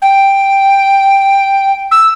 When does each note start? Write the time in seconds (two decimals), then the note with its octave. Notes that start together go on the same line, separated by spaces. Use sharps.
0.02 G5
1.91 E6